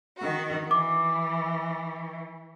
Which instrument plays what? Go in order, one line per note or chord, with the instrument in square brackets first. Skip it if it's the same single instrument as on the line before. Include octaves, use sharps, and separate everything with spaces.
[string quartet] D#3 F#4
[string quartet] E3 [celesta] D6